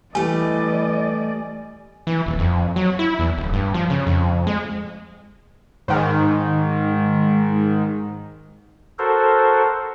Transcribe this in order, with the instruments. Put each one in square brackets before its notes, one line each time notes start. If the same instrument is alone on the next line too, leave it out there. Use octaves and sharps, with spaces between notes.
[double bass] E3 [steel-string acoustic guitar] G3 A3 [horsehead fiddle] D5 D#5 [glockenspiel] G#5
[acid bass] E3
D#1
F2
F#3
E4
E2
D1
G2
F3
C#3
F2
G#3
[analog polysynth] G#2 D#3
[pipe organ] F#4 A4 A#4 C5